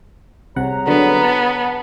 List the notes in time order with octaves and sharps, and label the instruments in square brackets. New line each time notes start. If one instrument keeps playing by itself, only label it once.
[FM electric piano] C2 C3 F#5 [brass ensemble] G#4 C#5 A#5
[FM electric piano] D3 F#3 [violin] B3
[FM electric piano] A5